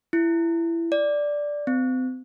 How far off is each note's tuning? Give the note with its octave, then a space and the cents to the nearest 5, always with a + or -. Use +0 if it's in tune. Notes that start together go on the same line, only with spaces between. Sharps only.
E4 +20
D5 +0
C4 -35